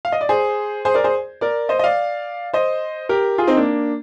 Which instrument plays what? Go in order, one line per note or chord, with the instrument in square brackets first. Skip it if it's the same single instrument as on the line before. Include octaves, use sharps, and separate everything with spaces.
[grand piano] F5
D#5
D5
G#4 C5
G#4 C5
A#4 D5
G#4 C5
A#4 D5
C5 D#5
D#5
D5 F5
C5 D#5
G4 A#4
F4 G#4
C4 D#4
A#3 D4